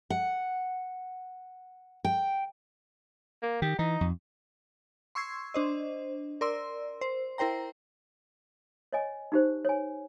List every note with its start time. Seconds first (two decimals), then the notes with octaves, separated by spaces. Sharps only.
0.10 F#5
2.05 G5
3.43 A#3
3.62 D#3 G4
3.79 E3 D#4
4.01 F2
5.15 C6 C#6 E6 G#6 C7
5.54 D4 C5 D#5
6.41 A#4 D5 C6 E6
7.01 C5
7.38 E4 A#4 C5 G5 A#5
8.93 C#5 D#5 G#5
9.32 D#4 G4 C5
9.65 C#5 G#5